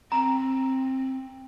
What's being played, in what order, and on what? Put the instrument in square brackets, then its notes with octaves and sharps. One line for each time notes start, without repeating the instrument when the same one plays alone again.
[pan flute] C4 [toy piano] A#5